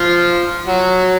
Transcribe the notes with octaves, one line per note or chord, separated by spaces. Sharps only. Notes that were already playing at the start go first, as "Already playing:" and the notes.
Already playing: F3 F4
F#3 F#4